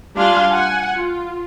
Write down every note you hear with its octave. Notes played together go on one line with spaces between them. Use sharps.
G3 D4 F4 F5 G#5 C6
F#5 G#5
F4